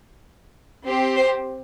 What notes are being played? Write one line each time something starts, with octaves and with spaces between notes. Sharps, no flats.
C4 G4
C5